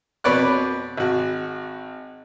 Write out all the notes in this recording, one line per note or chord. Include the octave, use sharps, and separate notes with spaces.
F2 B2 B4 C#5 D5 F#6
G#1 F#4